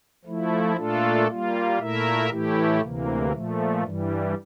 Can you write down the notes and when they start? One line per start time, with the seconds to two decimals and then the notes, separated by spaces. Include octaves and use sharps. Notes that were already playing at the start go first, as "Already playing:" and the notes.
0.25 F3 A3 E4
0.76 A#2 A3 D4 F4 A4
1.28 G3 A#3 F4
1.78 A#2 A3 E4 A#4 E5
2.29 A2 E3 A3 E4 G4
2.81 D2 C3 E3 A#3
3.32 A#2 F3 A3
3.83 G2 E3 G3